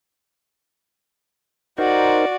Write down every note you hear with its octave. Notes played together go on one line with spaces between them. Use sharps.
D#4 F#4 A#4 C5 D5